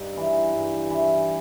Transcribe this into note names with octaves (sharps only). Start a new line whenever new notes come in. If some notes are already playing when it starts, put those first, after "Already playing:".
Already playing: G2 D#4
E3
G2
E3